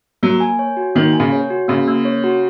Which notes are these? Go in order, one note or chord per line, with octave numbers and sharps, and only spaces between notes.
F#3 A#3
G#5
C#5
F#4
D#3 A#3
G#5
C#3
C#5
F#4
C#3 A#3
A#3
C#5
F#4